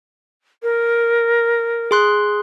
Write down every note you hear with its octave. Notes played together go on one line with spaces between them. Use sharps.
A#4
G#4 C6 F#6